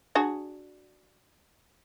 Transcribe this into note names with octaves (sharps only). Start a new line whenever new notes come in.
D4 F#4 G#4